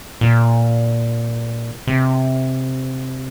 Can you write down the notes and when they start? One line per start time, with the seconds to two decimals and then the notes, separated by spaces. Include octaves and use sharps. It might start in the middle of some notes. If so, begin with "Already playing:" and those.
0.21 A#2
1.87 C3